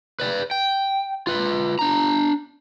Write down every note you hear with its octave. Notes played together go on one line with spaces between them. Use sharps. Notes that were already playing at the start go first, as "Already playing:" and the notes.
B4 D5
G5
F4 B4
D4 A#5